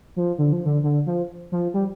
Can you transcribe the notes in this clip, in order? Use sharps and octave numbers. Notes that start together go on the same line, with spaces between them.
F3
D3
F3
D3
D3
F3
F3
G3